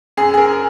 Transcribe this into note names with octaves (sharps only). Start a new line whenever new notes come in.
F#2 G#4
G#4
A#4